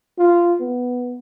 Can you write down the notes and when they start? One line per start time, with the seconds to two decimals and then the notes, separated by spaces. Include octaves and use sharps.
0.18 F4
0.61 B3